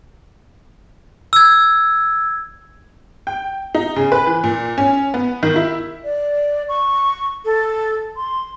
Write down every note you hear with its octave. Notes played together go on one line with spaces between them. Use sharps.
E6 G#6
G5
D#4
C#3
B4
E3
A#2
C#4
B3
D#3
E4
D5
C#6
A4
C6